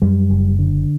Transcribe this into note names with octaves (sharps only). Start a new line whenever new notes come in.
F#2 G3
F#1
D3